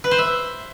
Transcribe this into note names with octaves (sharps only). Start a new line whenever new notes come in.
B4
C5
E5